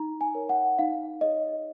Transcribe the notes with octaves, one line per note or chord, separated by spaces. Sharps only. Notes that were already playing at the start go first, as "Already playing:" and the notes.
Already playing: D#4 A#5
G#5
A#4 C#5
F#5
D#4 F5
G#4 C#5 D#5